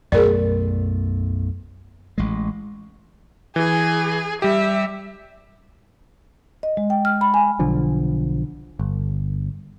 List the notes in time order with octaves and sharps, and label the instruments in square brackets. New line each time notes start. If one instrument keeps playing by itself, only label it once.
[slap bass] B1 F#2 A3 [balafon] G#4 A#4 D5
[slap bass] A1 G#3
[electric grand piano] E3 [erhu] G#4
[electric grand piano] G3 G4 [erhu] E5
[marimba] D#5
G#3
G5
F6
B5
G#5
[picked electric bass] B1 D3 F3
G1